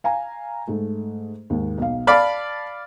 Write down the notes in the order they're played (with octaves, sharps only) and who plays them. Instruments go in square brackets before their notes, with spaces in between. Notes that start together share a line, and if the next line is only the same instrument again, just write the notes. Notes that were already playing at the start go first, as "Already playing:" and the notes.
[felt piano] F5 G#5 A#5
G#2 A3
D#2 G#2
B1 F5
[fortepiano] D5 F5 B5 [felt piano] A5 D6 A6